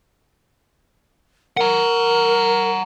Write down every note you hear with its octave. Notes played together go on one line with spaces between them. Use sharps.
A#4 F#5 A#5